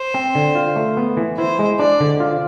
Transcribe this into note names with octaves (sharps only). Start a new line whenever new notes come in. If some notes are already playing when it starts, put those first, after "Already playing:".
Already playing: C5
C4
D3
F4
A3
B3
E3
E4 C5
G#3
D4 D5
D3
F4